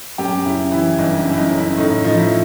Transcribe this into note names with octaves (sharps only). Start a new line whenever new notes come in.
F#2 G4
C#3 E4
E3 E4
G1 D#4
F#2
E4
D#4
C#3
E4
A2 D#4
F3 D#4
E4